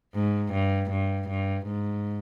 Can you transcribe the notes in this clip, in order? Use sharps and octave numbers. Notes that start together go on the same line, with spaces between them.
G#2
G2
G2
G2
G#2